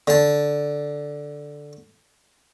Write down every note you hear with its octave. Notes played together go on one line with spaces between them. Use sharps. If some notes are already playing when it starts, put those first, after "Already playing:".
D3 A5